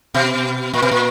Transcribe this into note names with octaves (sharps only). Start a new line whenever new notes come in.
B2
A#2
B2
A#2